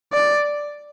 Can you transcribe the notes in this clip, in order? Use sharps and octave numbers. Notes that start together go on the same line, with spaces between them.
D5